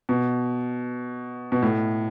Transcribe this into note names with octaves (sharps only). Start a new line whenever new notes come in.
B2
B2
A2